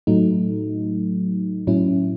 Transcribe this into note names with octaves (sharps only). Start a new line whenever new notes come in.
A2 F#3 A3 D#4
A2 F#3 C#4 E4